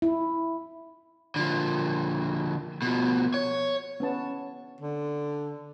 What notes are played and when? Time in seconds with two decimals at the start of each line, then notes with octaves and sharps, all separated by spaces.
0.02 E4
1.36 D3 F3
2.82 B2 F3
3.34 C#5
4.00 B3 C#4 A5
4.81 D3